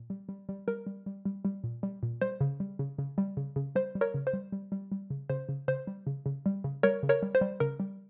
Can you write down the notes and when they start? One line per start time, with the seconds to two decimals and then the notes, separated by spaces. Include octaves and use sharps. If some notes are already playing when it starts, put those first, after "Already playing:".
Already playing: A#2
0.10 G3
0.29 G3
0.49 G3
0.68 G3 A#4
0.86 G3
1.06 G3
1.25 G3
1.45 G3
1.64 A#2
1.83 G3
2.03 A#2
2.22 G3 C5
2.41 C#3
2.60 G3
2.79 C#3
2.98 C#3
3.18 G3
3.37 C#3
3.56 C#3
3.75 G3 C5
3.95 G3
4.01 A#4 C#5
4.14 C#3
4.27 C5
4.33 G3
4.52 G3
4.72 G3
4.92 G3
5.10 C#3
5.30 C#3 C5
5.49 C#3
5.68 C#3 C5
5.87 G3
6.07 C#3
6.26 C#3
6.46 G3
6.64 C#3
6.83 G3 A#4 C#5
7.03 C#3
7.09 A#4 C#5
7.23 G3
7.35 C5
7.41 G3
7.60 C#3 A#4
7.80 G3